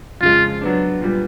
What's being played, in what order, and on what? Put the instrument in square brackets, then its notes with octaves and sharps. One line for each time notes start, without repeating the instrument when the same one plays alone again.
[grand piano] F2 C#3 F3 G#3 [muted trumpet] F4
[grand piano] F#3 B3 D4
A#2 G3 B3